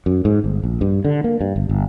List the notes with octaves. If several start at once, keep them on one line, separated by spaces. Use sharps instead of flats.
F#2
G#2
G1
A#1
G2
D3
A#3
G2
G1
G1